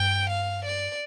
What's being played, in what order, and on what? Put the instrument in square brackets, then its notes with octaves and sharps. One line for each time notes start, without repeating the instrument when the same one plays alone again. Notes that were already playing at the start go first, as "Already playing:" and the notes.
Already playing: [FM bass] G2 [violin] G5
[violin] F5
D5